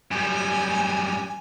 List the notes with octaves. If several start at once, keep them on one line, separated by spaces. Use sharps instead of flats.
F#2 G3 G#5